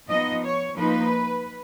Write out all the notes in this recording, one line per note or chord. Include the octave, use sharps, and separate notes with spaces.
F3 B3 D#4 D#5
C#5
F3 A#3 D#4 B4